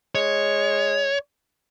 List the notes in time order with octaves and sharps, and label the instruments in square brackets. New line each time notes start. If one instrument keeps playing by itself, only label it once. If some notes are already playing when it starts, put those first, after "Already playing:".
[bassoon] G#3 [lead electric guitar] C#5